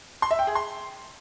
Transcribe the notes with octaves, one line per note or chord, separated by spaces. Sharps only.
C6
E5
G5
G#4
C6